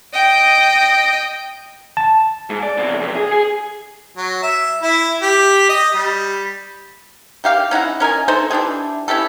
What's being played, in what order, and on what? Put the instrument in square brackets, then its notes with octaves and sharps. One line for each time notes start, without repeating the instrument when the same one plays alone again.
[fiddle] D#5 G5
[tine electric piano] A5
[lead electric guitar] G#2
D5
E2 C3
F2 C3
G#4
G#4
[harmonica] F#3
E5
E4
G4
D#5
G3
[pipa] D#3 G4 F5 G5
C#4 D#4 E4 F#5
C#4 A#4 D#5 G#5
D#4 A4 C5
E3 D4 G4 G#4
C#4 E4 G4 A4